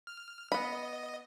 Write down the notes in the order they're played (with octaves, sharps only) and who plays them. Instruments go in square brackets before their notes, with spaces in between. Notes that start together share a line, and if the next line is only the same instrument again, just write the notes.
[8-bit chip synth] F6
[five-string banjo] B3 B5 [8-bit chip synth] D#5